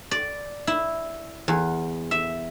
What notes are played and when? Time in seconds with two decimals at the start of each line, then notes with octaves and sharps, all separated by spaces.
0.11 D5
0.67 E4
1.48 E2
2.11 E5